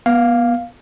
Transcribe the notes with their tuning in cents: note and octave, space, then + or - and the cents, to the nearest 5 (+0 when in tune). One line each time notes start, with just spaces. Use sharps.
B3 -30 F5 +0